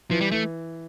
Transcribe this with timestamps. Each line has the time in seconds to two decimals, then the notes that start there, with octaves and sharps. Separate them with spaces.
0.10 E3 F3
0.21 G3
0.32 E3 A3